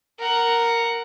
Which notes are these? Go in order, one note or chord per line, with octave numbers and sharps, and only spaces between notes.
A#4 F#5